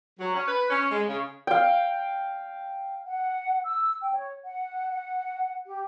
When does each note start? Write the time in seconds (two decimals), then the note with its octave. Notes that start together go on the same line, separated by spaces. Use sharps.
0.19 F#3
0.34 C#4
0.48 B4
0.70 C#4
0.91 G#3
1.09 C#3
1.47 F5 G5
3.07 F#5
3.64 E6
4.02 G5
4.14 C#5
4.44 F#5
4.90 F#5
5.67 G4